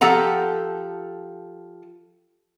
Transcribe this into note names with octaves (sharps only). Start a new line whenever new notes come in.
F3 G4 A4 F#5 A#5